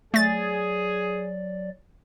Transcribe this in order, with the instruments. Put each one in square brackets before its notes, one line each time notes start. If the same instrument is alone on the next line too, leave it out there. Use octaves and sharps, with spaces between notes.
[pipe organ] F#3 D5 [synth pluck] A3 A6 [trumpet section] G#4